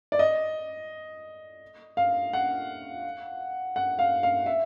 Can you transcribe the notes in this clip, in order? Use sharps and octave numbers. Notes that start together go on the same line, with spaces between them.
D5
D#5
F5
F#5
F#5
F5
F5
E5